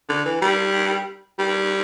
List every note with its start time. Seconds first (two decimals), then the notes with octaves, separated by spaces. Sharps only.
0.09 D3
0.25 E3
0.41 G3
1.39 G3